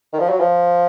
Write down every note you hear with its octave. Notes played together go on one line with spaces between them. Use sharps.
D#3
F3
F#3
F3